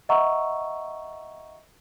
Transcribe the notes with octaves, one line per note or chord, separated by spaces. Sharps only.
D#5 E5 F#5 A#5 C#6 E6